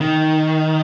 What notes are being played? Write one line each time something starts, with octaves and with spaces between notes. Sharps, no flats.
D#3